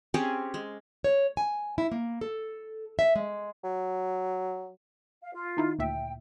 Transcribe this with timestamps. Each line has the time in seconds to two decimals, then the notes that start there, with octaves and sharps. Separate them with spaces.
0.14 C4 C#4 G4 G#4
0.54 G#3
1.04 C#5
1.37 G#5
1.78 E4
1.92 A#3
2.21 A4
2.99 E5
3.16 G#3
3.64 F#3
5.21 F5
5.33 F4
5.57 D#3 D#4 E4
5.79 D2 A#2 E5 G5